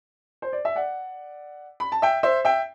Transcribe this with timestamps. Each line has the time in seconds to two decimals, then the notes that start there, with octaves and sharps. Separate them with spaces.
0.42 C5
0.53 D5
0.65 E5
0.75 D5 F#5
1.80 B5
1.92 A5
2.02 E5 G5
2.23 C5 E5
2.45 E5 G5